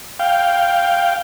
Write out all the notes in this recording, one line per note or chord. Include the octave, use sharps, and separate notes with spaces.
F5 G5